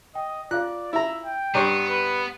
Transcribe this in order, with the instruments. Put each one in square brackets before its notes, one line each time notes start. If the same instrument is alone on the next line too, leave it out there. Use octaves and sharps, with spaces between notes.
[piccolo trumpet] D#5 [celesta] G5
[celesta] F4 F5 [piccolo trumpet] D5 [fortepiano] F#6
[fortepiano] E4 A#5 [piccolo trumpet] E5
[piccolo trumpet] G5
[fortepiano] G2 C#5 [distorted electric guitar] B3 [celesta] A#5 C6
[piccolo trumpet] B4